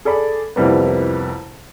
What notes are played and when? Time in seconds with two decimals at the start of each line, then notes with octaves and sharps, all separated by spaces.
0.05 G#4 A4 D5 B5
0.56 C2 F2 E3 G3 A#3 B3